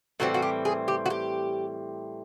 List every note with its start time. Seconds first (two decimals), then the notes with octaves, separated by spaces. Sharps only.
0.20 A2 E3 G3 C4 F#4
0.34 F#4
0.42 G4
0.65 G#4
0.88 G4
1.06 F#4
1.10 G4